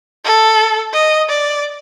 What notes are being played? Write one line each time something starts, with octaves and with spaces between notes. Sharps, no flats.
A4
D#5
D5